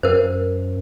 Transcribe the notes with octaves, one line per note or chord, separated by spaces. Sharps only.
F#2 A#4 C5